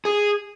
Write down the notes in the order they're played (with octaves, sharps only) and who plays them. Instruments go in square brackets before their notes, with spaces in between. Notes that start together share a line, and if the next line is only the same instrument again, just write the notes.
[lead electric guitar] G#4